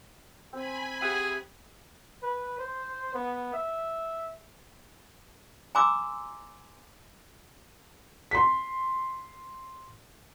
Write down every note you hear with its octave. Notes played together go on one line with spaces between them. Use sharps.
C4 G#5 B5
G4 G#4 E5 F#5
B4
C5
B3
E5
G#5 A#5 C6 D6 E6
C6 B6